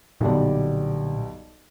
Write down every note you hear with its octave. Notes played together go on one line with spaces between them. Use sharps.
B1 A#2 D3 G3 D5